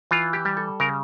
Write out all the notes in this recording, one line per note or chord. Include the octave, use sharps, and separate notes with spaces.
E3 F4
G4
G3
A4
C#3 A#4